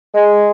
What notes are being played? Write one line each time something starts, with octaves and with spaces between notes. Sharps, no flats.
G#3